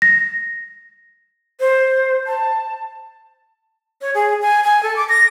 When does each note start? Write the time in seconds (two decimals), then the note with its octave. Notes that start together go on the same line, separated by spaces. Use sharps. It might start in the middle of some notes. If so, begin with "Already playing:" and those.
0.02 A#6
1.60 C5
2.27 A5
4.01 C#5
4.15 G#4
4.42 G#5
4.64 G#5
4.83 A4
4.96 D6
5.09 A#6